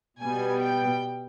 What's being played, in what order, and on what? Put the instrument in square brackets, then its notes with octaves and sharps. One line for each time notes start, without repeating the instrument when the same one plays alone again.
[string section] B2 G3 B3 G#5
G5